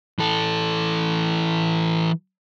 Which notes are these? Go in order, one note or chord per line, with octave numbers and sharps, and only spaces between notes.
E3 A4